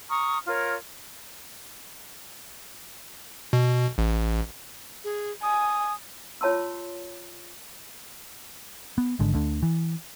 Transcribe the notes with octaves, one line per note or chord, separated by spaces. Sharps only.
A#5 C#6 D#6 F6
F4 A#4 C#5
B2
A1
G#4
G#5 D#6
F4 C#5 A5 C6 E6
B3
G#1 G#2 D3
D2 D3
E3